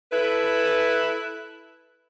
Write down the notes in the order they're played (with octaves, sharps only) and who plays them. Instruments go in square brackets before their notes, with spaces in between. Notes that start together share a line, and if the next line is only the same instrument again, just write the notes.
[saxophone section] E4 A4 B4